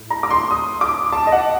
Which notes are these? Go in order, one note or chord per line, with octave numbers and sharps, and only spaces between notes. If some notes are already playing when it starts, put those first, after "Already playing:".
Already playing: A2
A#5
D6
C6
D#6
D6
A5
D#5
F#5